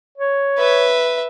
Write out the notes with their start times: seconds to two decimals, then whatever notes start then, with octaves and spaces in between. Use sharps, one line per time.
0.18 C#5
0.58 B4 E5